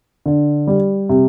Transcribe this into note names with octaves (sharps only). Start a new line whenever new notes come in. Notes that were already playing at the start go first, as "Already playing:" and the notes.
D3
G3
C3